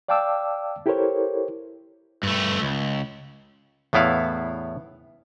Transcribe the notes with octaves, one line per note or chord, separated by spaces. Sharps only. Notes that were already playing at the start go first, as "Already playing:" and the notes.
D5 F5 G5 A5 D6 E6
E4 G4 A4 A#4 C5 C#5
G2 A3
C#2
E2 A2 B3 E4 F5